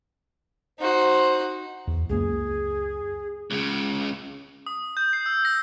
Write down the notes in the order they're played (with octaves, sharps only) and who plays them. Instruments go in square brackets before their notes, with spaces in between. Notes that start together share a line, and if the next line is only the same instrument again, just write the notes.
[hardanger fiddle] D#4 F#4 [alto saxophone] C5
[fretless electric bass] E2
[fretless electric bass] C#2 F#2 A#3 [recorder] G#4
[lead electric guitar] C#2 C#3
[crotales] D#6
G6
C7
E6
A#6